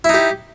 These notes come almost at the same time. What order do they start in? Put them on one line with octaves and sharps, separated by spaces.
E4 D#4 G4